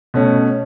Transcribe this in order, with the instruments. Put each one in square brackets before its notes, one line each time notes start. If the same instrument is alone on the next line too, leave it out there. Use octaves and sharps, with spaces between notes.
[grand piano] B2 A3 C#4